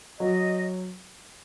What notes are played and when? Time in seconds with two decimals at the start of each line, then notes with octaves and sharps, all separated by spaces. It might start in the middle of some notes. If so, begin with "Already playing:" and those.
0.20 F#3 D#5